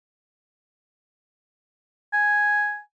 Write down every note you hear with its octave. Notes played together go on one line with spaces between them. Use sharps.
G#5